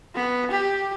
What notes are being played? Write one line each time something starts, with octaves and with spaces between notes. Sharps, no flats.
B3
G4